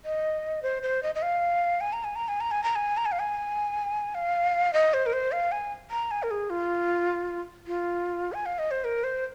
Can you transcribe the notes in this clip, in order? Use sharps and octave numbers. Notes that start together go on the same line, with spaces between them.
D#5
C5
C5
D#5
D#5
F5
G#5
A#5
G#5
A#5
G#5
A#5
G#5
A#5
G#5
A#5
G#5
F5
G#5
F5
D#5
C5
A#4
C5
F5
G#5
A#5
G#5
A#4
G#4
F4
F4
G#5
F5
D#5
C5
A#4
C5